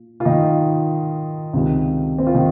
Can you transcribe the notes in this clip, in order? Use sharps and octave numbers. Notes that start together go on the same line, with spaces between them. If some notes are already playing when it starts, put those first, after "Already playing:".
Already playing: A#2
F4
D#3 D#4
C#2 C3 D#3
C4
F4
D#3 D#4